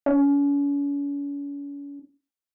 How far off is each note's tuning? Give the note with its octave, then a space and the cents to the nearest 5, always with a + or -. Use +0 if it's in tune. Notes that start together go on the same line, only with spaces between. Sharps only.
C#4 +40